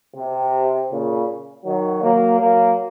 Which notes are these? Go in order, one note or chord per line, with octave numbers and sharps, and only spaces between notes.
C3
A#2 C#3
D#3 F#3
F#3 A#3
F#3 A#3